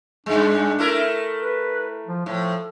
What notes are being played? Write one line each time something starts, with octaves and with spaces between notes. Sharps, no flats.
G2 G#3 D4
A3 E4 A#4
B4
F3
A2 F3